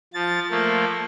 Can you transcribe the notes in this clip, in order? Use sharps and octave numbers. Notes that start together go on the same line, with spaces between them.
F3 A6
F3 A3 A#3